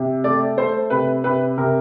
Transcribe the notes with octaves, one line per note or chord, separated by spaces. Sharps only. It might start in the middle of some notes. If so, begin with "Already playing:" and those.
Already playing: C3
A3 D5
A3 C5
C3 B4
C3 B4
C3 A#4